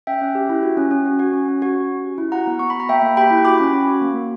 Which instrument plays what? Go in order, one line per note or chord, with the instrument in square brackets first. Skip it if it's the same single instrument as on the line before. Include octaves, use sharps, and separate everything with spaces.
[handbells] C#4 E5 G5
C#4
G4
E4
F#4
C#4
C#4
F#4
F#4
C#4
C#4
F#4
C#4
C#4
G4
E4
F#4 F#5 A#5
B3
B3 C#6
B5
F#4 A#5
A#3 E5 G5
A#3
G4 G5 B5
E4
F#4 B5 D6
C#4
C#4
F#4
A#3
A#3